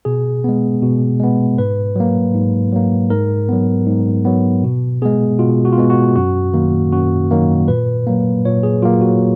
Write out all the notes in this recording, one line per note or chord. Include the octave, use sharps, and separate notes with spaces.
B2 G#4
G#3 B3
B2
G#3 B3
G#2 B4
F#3 A#3
G#2
F#3 A#3
G#2 A#4
F#3 B3
G#2
F#3 B3
B2
G#3 B3 G#4
B2 F4
F#4
F4
G#3 B3 F#4
F#4
F#2 F#4
D#3 F#3 A#3
F#2 F#4
D#3 F#3 A#3
A#2 B4
F#3 A#3
A#2 C#5
G#4
F#3 A#3 F4
F#4